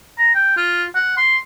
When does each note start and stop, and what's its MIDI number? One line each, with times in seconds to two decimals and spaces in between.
0.18 0.35 82
0.35 0.54 79
0.57 0.85 65
0.95 1.16 78
1.17 1.36 84